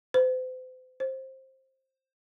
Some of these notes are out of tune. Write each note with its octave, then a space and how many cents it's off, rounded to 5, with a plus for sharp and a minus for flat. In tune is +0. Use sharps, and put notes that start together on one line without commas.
C5 -40
C5 +15